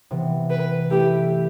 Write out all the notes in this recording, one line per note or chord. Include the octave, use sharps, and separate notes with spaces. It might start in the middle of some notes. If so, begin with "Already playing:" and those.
C3 E3 B3
B4
A3 E4 G4 B4